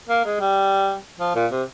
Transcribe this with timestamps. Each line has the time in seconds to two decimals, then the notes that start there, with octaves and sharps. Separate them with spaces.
0.09 A#3
0.25 G#3
0.40 G3
1.20 F3
1.35 A#2
1.52 C3